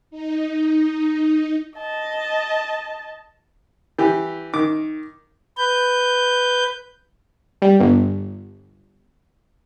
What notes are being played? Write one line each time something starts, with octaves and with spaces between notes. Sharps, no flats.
D#4
D#5 A5
E3 G4
D#3 D6
B4 G6
G3
G1